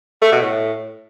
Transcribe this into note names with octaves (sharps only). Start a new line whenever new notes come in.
A3
B2
A2